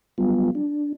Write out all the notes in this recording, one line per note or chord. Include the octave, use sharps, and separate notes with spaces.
F#3 G3 B3 F4
D4